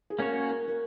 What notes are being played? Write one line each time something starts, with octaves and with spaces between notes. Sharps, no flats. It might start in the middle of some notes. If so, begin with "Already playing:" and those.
G#4
A#3 C#4 F#4 A#4 C#5
A#4
A#4